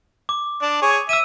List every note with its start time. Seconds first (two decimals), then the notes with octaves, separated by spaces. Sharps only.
0.29 D6
0.62 D4 D5
0.82 G#4 C#5
1.09 E5 E6 D#7